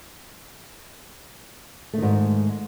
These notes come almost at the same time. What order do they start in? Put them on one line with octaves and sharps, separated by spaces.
A3 D#3 G#2